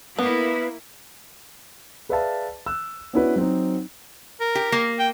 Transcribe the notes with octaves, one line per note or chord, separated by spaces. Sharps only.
A#3 B3 E4
G#4 B4 D5 E5 F5 A5
E6 F#6
B3 C#4 D4 E4 F#4 B4
F#3 C4 D#4
A#4
G4
A#3
G5